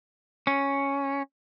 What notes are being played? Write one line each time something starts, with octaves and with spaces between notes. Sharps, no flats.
C#4